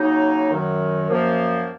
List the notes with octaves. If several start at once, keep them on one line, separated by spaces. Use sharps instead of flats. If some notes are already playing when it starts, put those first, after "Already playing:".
Already playing: C#3 F#3 A#3 D#4
F#2 D#3 F#3
F#2 F3 A#3